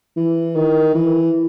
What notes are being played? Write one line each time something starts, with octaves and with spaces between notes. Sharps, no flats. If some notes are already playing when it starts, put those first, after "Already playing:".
E3
D#3
E3